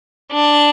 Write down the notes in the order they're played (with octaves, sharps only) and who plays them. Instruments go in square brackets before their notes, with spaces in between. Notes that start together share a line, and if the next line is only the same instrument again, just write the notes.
[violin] D4